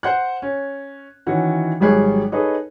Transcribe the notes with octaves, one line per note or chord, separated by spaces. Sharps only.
C5 F#5 F#6
C#4
D#3 E3 C#4 F#4
G#1 F#3 G3 G#4 C#5 F#6
D#4 G#4 A4 B4 C#5 D#5